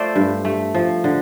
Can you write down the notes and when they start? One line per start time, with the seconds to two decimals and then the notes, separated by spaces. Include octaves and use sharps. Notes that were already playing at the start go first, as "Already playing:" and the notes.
Already playing: A3 F4 C5 D5 E5
0.16 G2
0.45 A3
0.74 F3
1.04 D3